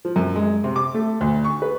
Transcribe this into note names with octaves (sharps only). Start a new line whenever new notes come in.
F3
F#2
G#3
C3
D6
A3
D2
C#6
B4